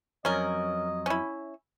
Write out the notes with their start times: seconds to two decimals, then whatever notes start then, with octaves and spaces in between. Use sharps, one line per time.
0.25 F2 F#3 C#4 A#4 D#5
1.06 C#4 E4